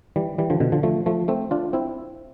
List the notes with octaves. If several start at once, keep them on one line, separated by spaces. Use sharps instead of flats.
E3 G3
E3 G3
D3 F3
B2 D3
D3 F3
F3 A3
F3 A3
A3 C4
D4 F4
C4 E4